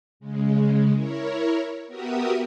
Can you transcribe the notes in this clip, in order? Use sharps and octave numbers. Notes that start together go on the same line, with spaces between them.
C#3 G#3
E4 A#4 C#5
B3 F#4 G4 A#4 E5 D#6